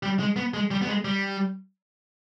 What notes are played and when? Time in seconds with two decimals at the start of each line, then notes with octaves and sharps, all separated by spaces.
0.03 G3
0.19 G#3
0.36 B3
0.54 G#3
0.71 G3
0.81 B3
0.87 G#3
1.05 G3